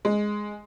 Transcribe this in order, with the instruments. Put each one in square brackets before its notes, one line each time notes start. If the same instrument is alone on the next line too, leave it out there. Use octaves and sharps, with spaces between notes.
[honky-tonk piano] G#3